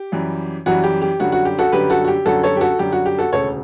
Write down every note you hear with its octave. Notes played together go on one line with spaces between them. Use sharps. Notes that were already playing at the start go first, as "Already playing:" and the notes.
Already playing: G4
F#2 E3 G3
F#2 E3 G3 F#4
G4
G4
F#2 D3 G3 F#4
F#4
G4
F#4 A4
F#2 D3 G3 G4 B4
F#4 A4
F#4
G4
F#2 D3 G3 F#4 A4
A4 C#5
G4
F#4 A4
F#2 D3 G3 G4
F#4
G4
F#4 A4
E1 D2 C#3 A4 C#5